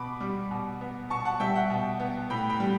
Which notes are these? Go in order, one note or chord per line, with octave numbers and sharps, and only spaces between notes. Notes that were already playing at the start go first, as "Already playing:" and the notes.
Already playing: B2 B5 D6
G3
B2
B3
B2 A5 C#6
F#5 A5
G3 E5 G5
F#5
B2
B3
A2 G5 B5
G5 B5
G3